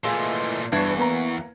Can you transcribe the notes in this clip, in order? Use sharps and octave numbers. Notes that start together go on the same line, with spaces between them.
A#2 E3 G#3 A3 F4
G1 E2 E3 D4 F#4 B4 G#6
A#3 B3 B4 A#5